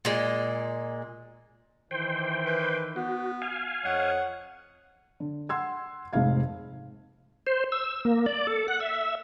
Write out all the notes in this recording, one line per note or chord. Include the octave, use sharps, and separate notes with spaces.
A#2 G#3
D#3 E3 C5 G5
B4
B3 F#4
F5 G#5
F2 C#5 D#5 F#5
D3
F#5 C6 E6 G#6
F1 G#2 C4 F5 G#6
C5
E6
A#3
D5
A4
F#5
E5